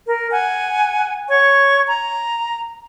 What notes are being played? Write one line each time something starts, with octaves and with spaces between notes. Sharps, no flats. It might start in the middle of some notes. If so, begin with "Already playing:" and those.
A#4
F#5 G#5
C#5 C#6
A#5